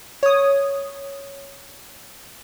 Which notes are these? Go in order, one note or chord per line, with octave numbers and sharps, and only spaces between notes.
C#5 D#6